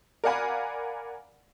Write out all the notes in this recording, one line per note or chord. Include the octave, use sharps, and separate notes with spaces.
A#4 D5 F5 F#5 G#5 B5